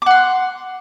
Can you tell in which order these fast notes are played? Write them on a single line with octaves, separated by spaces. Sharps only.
D6 F#5 C6